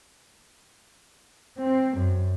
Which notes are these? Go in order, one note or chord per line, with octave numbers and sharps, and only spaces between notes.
C4
F#2